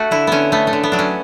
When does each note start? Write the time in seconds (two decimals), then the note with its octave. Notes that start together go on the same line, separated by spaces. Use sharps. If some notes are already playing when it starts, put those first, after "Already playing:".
Already playing: A3 F#4
0.11 D3 E4
0.27 D3 B3 C#4
0.52 A3 B3
0.67 A3
0.73 D3
0.83 B3
0.92 F#3 D4
0.99 C#4